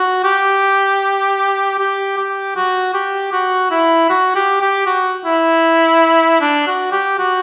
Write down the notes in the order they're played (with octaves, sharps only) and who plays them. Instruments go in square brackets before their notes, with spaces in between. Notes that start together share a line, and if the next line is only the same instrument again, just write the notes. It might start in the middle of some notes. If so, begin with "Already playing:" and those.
Already playing: [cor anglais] F#4
G4
G4
G4
F#4
G4
F#4
E4
F#4
G4
G4
F#4
E4
D4
F#4
G4
F#4